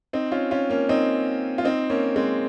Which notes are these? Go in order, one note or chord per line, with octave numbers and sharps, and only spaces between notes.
C4 D#4
C#4 F4
C#4 F4
A#3 C#4
C4 D#4
F4
C4 D#4
A#3 C#4
G#3 C4